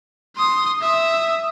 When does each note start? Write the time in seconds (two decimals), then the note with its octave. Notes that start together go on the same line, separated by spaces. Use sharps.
0.36 C6 D#6
0.81 E5 D#6